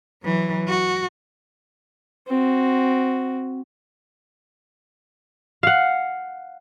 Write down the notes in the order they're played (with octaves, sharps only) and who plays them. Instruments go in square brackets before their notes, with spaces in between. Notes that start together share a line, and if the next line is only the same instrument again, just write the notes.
[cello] E3 F#3
F#4
[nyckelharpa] C4 F#4
[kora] F5 F#5